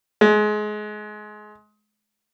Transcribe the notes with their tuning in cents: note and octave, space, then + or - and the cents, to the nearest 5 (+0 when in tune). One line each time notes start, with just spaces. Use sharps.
G#3 +25